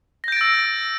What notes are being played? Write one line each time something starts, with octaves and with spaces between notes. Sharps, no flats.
E6 G6 A6 A#6 D7